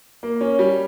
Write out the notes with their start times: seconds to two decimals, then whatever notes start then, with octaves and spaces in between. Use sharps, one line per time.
0.23 A#3
0.41 C#4
0.59 G3